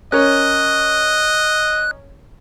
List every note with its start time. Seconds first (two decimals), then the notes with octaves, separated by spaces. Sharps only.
0.12 C#4 A#4 C#5 D#5 F#6